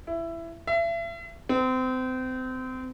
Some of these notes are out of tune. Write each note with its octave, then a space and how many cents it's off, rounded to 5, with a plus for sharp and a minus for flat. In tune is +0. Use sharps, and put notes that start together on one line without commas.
E4 +15
E5 +35
C4 -30